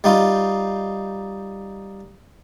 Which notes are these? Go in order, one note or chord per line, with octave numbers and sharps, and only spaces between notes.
G3 D#4 F4